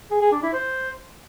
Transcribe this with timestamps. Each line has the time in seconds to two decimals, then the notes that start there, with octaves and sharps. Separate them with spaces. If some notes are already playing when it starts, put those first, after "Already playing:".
0.11 G#4
0.21 G#4
0.32 D4
0.42 E4
0.53 C5